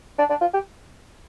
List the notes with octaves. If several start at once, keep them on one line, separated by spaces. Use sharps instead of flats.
D4
D4
F4
G4